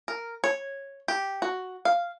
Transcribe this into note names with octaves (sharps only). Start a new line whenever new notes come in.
A#4
C#5
G4
F#4
F5